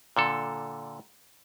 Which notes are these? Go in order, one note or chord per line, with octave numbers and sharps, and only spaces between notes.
A#2 D3 A4